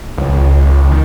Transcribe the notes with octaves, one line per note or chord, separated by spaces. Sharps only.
C#2
D#3